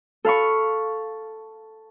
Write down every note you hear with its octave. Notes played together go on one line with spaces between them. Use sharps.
A4 F5 B5 C#6